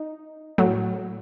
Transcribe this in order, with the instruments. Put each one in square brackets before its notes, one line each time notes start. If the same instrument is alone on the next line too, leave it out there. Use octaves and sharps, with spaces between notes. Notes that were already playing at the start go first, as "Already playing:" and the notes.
Already playing: [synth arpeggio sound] D#4
A2 F#3